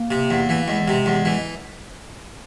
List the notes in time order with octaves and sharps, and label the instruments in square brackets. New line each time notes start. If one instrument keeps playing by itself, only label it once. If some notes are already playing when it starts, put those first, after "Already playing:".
Already playing: [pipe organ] A#3
[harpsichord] C3
E2
E3
[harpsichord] E2 [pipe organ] G#3
[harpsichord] C3
E2
E3